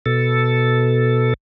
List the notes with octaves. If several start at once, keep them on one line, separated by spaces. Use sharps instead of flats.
B2 A4